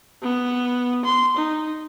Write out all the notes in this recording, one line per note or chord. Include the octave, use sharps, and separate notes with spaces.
B3
C6
D#4